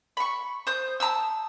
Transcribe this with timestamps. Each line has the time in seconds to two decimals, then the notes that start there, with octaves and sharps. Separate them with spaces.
0.17 B5 C#6
0.67 C5 D#6 G6
1.00 A5 A#5 D#6 E6